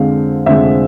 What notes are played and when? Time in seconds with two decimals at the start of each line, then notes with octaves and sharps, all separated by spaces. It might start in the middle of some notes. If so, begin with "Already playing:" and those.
Already playing: F2 D3 G#3 C4 F5
0.46 F2 D3 G#3 C4 E5